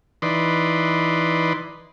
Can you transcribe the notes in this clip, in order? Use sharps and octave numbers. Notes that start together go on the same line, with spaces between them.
E3 D#4 B4 D5 C6